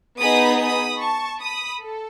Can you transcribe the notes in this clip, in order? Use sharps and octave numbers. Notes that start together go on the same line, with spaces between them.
B3 D#4 G#4 B5 D#6
B5 D#6
A5 C#6
B5 D#6
A4